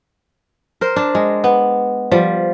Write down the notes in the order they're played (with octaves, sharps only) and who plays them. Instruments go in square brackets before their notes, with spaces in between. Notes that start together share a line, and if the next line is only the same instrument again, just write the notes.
[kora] A#4 C5
D4
G#3
B3
F3 G3